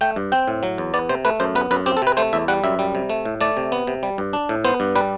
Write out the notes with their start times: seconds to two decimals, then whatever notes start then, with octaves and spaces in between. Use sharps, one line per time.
0.01 A3 G5
0.16 G2
0.32 C4 G5
0.48 A2
0.63 F#3
0.78 E2
0.94 B3 D5
1.09 C3 C5
1.25 A3 B4
1.40 F#2 C5
1.55 B3 B4
1.71 F#2 B4
1.86 C4 G4
1.97 A4
2.02 C3 B4
2.17 A3 C5
2.33 E2 E5
2.48 G3 F#5
2.64 F#2 E5
2.79 G3
2.95 C3
3.10 A3
3.25 A2
3.41 A3 D5
3.57 C3
3.72 B3
3.87 C3
4.03 G3
4.18 G2
4.33 D4
4.49 A2
4.65 B3 C5
4.80 G2
4.95 G3 B4